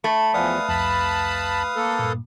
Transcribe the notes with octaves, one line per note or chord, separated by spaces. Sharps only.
A3 B5
E2 F3 B4 D5 F5 F#5 G#5 D#6
C2 F2 A5 B5
A#3 A4
G2 A#2